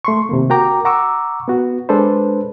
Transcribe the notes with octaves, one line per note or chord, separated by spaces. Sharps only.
A3 C6 C#6
C3 D#3 A#3
F#4 A#4 G5 A#5 D6
F#5 A#5 C#6 D6 E6
B3 F#4
G#3 D4 A4 B4 C5